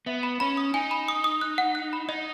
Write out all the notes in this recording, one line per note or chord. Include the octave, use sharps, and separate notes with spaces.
B3 E5
B5
C#4 B5
D#6
D#4 G#5
B5
D#6
D#6
F#6
F#5
F#6
B5
D#4 D#5